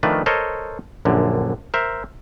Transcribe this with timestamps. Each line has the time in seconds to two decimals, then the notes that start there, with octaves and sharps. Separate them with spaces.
0.03 D#3 F3 A3 D4 B4
0.26 A4 A#4 C5 C#5 D#5
1.05 A#1 F#2 D3
1.74 A#4 C5 E5